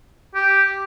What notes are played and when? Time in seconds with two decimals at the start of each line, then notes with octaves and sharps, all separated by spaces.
0.35 G4